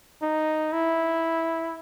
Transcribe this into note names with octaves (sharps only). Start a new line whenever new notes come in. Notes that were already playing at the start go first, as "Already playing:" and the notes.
D#4
E4